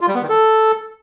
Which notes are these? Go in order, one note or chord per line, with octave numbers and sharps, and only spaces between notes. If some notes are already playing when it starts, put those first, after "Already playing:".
F4
G3
B3
D#3
A4